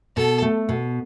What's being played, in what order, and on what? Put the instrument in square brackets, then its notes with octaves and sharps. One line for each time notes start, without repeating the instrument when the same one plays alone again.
[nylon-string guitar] B2 [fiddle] A4
[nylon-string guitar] A3
B2